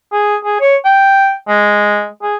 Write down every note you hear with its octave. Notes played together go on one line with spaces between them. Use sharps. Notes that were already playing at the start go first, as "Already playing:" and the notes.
G#4
G#4
C#5
G5
G#3
G#4